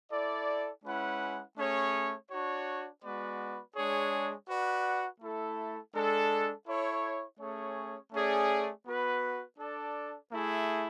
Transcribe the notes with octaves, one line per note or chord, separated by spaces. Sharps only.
E4 A4 D5
G#3 C#4 E4 B4 F#5
A3 C#4 G#4 C#5
D4 F#4 C#5
G#3 B3 F#4 B4 D5
G#3 D4 G#4 C#5
F#4 B4 D5 F#5
A3 E4 A4
G#3 D4 A4
E4 A4 C#5
A3 C#4 G#4 C#5
A3 C#4 G#4 D5
B3 F#4 B4
D4 A4 D5
A3 E4 G#4